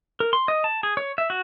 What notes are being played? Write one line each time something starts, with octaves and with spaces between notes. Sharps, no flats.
A#4
C6
D#5
A5
G#4
C#5
E5
F#4